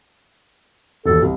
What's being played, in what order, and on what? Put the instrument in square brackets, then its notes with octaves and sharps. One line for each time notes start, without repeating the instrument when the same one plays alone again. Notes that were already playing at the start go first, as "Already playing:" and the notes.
[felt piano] E1 D#2 [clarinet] A4
[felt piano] C2